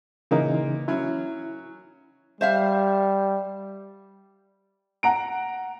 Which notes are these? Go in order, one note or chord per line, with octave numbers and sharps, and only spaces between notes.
A#2 C#3 E3 A#3 D#4
F#3 C#4 E4
G3 C5 E5 F5
F#5 A#5 D7